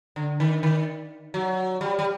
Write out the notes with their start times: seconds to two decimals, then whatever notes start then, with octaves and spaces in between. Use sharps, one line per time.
0.16 D3
0.40 D#3
0.63 D#3
1.34 F#3
1.81 G3
1.99 G3